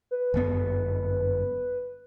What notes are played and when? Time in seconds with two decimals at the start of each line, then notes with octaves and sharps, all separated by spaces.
0.11 B4
0.34 G1 F#2 B3